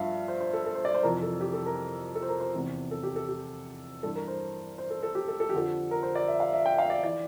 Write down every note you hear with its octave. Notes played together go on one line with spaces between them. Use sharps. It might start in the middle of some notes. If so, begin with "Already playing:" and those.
Already playing: G2 F3 E5 F5
C5
C5
A4
A4
C5
D5
C5
F2 C3 E3 A#4
A4
G4
A4
A#4
A4
C5
A#4
C5
E2 C3 E3
A4
G4
A4
G4
G2 E3 A4
A#4
C5
C5
A4
A4
G4
A4
A4
G4
F2 D3 F3 A4
A#4
C5
D5
E5
F5
E5
G5
F5
D5
E3 D5